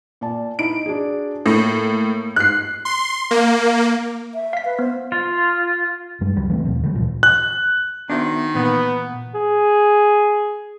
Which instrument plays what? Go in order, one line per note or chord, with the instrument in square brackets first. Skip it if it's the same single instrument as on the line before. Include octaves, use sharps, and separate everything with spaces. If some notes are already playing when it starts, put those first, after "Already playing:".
[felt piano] A#2 D5 A5
[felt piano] D#4 E4 [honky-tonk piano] D7
[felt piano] D4 F#4 G#4
[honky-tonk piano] A2 [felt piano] A#3 A#6
[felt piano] G#2 [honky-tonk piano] F#6 C7
[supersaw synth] C6
A#3
[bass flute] E5
[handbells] F5 B6
[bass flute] B4
[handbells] B3 [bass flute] C5
[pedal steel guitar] F4
[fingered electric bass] F#2 G3 G#3
C#2 F#3 G3
E3 A3 C4
D#2 B2 F3
D3 E3 G3 A3
D2 A#2 E3 F3
[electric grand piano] F#6
[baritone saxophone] D#3 [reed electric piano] B3 E5 [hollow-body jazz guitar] D4 F#4 C5
[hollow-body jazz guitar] A#2 [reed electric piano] E3 [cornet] B3
[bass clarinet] G#4